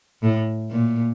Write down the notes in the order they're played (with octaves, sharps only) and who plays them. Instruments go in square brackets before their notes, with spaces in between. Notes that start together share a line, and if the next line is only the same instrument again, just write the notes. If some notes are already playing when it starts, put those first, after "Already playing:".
[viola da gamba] A2
A#2